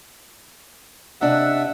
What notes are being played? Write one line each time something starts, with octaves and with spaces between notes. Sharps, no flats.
C3 D4 D#5 E5 F#5